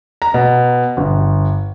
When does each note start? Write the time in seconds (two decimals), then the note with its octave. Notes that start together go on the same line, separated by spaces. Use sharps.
0.22 A#5
0.34 B2
0.97 G1